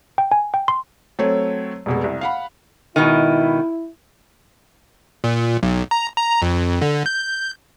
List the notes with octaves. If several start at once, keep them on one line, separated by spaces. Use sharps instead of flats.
G5
G#5
G5
C6
F#3 A3 C4 A4 C#5
F1 B2 G#3
C2
F5 F#5 B5
G#2 B2 D#3 E4
A#2
B1
A#5
A#5
F2
D3
G6